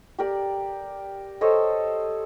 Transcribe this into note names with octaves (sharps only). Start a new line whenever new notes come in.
G4 A#4 D5
A4 C5 C#5 D#5